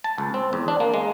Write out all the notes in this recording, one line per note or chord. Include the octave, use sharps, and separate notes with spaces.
A5
C#2
C4
E2
D4
A#3
G#3